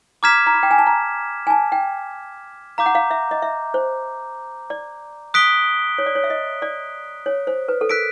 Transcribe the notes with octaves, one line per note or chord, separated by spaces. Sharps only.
A#5 D6 F6 G#6 B6 E7
A#5
B5
G5
G#5
A5
A#5
G#5
A5
G5
F5 A#5 D6 G6
F#5
F5
E5
D#5
E5
C5
D5
D#6 F#6 B6 D7 G7
C#5
D5
C#5
E5
D#5
D5
C#5
C5
B4
A4
A#4 F#6 B6 D7